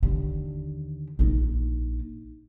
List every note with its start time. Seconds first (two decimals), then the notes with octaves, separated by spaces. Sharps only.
0.03 D#2 D3
1.19 A#1 D#4